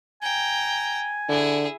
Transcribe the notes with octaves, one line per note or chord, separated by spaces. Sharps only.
G5 G#5 A#5
D3 E4 G#4